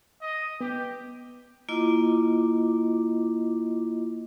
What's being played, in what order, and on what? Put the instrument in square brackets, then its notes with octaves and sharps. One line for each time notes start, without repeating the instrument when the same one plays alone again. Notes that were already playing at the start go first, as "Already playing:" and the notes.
[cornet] D#5
[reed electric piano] B3 [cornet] G4
[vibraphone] A#3 E4 F4 D#5 D6